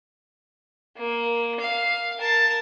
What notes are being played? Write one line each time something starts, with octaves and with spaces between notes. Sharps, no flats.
A#3
F5
A#4 A5